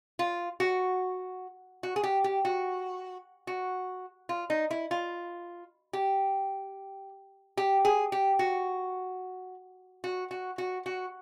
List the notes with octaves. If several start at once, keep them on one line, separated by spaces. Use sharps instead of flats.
F4
F#4
F#4
G#4
G4
G4
F#4
F#4
F4
D#4
E4
F4
G4
G4
G#4
G4
F#4
F#4
F#4
F#4
F#4